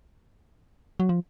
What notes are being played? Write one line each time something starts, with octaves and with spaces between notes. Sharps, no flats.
F#3
F3